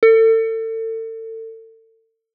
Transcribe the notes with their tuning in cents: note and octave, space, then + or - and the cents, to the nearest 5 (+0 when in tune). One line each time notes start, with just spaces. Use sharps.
A4 +35